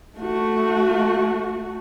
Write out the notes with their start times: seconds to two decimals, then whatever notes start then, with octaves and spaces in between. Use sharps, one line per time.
0.18 A3 F#4